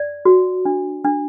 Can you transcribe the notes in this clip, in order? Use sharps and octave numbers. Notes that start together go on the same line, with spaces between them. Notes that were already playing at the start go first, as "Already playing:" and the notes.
Already playing: D5
F#4
D4
D4